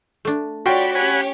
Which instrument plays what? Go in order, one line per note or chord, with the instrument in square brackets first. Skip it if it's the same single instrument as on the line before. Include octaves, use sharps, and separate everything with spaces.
[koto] A3 D4
[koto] F4 [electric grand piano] F#4 G5 [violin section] C#5 D5 G6 [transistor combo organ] B5
[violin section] C#4 G4 C#5 [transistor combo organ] F#5 G#5 B5